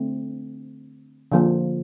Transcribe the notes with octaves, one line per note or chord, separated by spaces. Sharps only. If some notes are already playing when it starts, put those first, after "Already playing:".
Already playing: D3 A3 C4
D3 F3 A#3